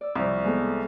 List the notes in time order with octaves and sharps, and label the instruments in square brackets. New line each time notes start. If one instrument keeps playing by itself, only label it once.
[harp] D5 E6
[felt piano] C2 [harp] F3 C#6
[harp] G#3 B3 A4